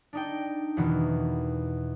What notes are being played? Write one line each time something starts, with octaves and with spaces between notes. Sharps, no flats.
D4 D#4 G5
E2 B2 D#3 E3